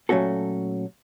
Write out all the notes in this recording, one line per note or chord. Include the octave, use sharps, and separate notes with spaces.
A#2 F#3 A3 C#4 F#4 A4